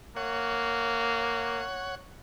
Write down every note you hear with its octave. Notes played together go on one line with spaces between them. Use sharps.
A#3 C#5 F#5